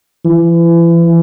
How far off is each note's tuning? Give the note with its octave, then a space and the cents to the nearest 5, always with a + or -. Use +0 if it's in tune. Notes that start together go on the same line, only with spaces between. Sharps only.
E3 +35